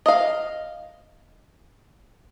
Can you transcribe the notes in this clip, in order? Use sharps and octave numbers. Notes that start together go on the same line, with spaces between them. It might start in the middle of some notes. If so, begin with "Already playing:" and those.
D#5 F5